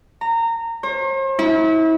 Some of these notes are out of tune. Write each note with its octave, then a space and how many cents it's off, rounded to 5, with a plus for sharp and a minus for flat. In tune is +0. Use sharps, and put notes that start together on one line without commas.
A#5 -20
C5 +45
E4 -35